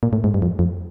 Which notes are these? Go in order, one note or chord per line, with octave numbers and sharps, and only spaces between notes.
A#2
A2
G#2
G2
F2
F2